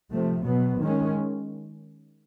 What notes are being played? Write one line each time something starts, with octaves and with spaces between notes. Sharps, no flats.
C3 F3 A3
B2 F#3 B3
D#3 G#3 C#4